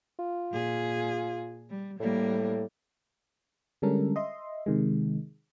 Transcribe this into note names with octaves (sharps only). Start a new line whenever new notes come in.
F4
A#2 G#4
G3
A2 G3 A#3
D3 G3 G#3 C#4 A4 A#4
D#5 E5 C6
C3 D#3 G#3